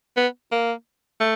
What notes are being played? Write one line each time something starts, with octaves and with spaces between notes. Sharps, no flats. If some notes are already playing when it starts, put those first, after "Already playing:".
B3
A#3
A3